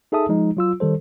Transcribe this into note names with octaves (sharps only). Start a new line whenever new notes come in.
D#4 G#4 A4 E5 A5 D#6
F3 G#3 D#4
F#3 F4 E6
D#3 G3 A4 C5